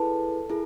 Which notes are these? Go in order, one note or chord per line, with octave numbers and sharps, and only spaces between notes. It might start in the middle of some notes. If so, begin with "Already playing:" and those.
Already playing: E4 G#4 A4 B4
E4 G#4 A#4